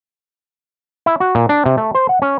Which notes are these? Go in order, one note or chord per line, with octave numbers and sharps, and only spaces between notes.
E4
F#4
A#2
D4
C3
A3
C5
F#5
C#4